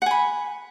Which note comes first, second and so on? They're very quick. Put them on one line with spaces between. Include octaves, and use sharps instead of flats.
F#5 G#5 B5